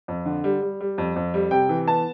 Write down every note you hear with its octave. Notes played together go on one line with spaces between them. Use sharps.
F2
D3
G3
G3
G3
F2
F2
G3
C3 G5
E3
B3 A5